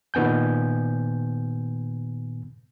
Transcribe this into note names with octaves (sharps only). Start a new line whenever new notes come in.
A#2 D#3 B3 G#5 G6